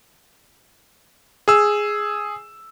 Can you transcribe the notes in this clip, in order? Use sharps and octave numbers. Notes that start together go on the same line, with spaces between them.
G#4 E6